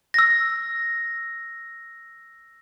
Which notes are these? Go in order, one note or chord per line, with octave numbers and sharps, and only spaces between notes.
E6 A#6